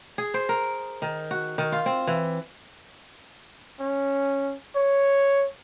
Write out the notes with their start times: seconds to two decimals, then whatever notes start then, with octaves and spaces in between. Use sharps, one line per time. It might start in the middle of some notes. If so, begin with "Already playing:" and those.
0.18 G#4
0.34 C5
0.49 A#4
1.02 D#3
1.31 F#4
1.58 D#3
1.72 F4
1.86 C4
2.07 E3
3.80 C#4
4.76 C#5